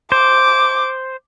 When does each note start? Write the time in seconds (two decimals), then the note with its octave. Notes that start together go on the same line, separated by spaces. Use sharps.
0.12 C5 D6